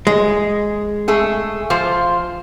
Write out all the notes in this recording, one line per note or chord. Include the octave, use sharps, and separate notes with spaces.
G#3
A3 G#4 A4
F3 F4 C5